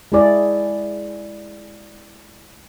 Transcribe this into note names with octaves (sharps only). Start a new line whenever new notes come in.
G#3 E4 G#4 D5